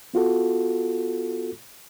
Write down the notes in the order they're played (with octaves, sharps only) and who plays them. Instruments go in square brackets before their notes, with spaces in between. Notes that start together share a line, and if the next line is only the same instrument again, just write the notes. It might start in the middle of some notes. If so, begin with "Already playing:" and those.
[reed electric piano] B3 F4 F#4 A4